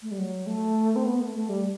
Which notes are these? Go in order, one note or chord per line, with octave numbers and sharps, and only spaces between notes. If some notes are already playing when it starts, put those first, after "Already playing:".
A3
G3
F#3
A3
C4
B3
A3
A3
G3